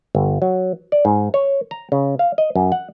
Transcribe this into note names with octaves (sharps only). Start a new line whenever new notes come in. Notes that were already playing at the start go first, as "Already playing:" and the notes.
G1
F#3
D5
G#2
C#5
A#5
C#3
F5
D#5
F#2
F#5